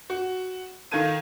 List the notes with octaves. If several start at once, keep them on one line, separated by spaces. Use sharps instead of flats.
F#4
D#3 F4 A4 G#6 D#7